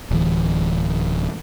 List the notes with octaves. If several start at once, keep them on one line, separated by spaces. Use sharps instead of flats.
D1 E3